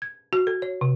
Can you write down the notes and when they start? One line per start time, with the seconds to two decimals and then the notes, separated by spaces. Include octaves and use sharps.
0.02 G#6
0.33 F#4
0.47 A4
0.62 C#5
0.81 C3